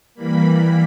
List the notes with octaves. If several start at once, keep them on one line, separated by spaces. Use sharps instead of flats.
E3 G3 A#3 B5